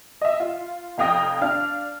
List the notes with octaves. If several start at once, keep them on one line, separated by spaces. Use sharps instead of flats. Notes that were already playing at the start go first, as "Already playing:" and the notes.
D#5 E5
F4
F1 F2 F5 G5 D#6 A#6
D4 F5 F6